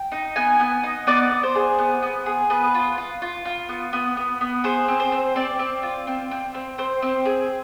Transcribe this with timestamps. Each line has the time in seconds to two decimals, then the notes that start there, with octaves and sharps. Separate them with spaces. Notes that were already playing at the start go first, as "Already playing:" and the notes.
Already playing: G5
0.12 D#4
0.36 B3 G#5
0.60 B3
0.84 D#4
1.07 B3 D5
1.31 B3
1.43 C5
1.55 G#4
1.79 B3
2.03 B3
2.26 G#4
2.50 B3 B4
2.75 F4
2.98 F4
3.22 F4
3.45 F4
3.69 B3
3.93 B3
4.17 B3
4.41 B3
4.64 G#4 C5
4.88 C4
5.00 C5
5.12 C4
5.36 C4 D5
5.59 C4
5.83 F4
6.07 C4
6.31 C4
6.54 C4
6.78 C4 C5
7.02 C4
7.25 G#4